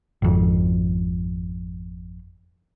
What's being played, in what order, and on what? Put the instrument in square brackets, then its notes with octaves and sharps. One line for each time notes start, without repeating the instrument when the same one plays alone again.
[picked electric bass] G#1 F2